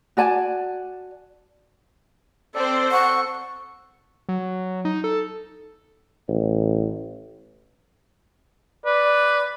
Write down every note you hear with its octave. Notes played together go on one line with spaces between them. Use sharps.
F#4 D5 G#5 A5
C4 A4 C5 D5
F#5 C#6
F#3
D#4
A4
A1
B4 D5